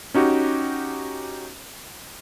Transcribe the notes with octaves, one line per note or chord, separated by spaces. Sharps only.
C#4 D#4 F#4 G4